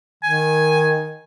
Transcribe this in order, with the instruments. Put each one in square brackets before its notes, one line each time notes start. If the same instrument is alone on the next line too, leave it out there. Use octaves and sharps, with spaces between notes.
[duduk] D#3 [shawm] G#5